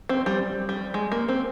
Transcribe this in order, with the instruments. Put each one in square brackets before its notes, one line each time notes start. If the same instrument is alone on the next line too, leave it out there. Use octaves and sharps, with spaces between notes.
[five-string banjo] C4
G3
G3
G#3
A#3
C4